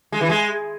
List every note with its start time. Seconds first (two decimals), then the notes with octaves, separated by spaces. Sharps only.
0.12 G#3
0.21 E3
0.29 G#3